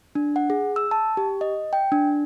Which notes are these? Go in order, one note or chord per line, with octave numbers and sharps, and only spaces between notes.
D4
F#5
G#4
E6
A5
G4
D#5
G5
D4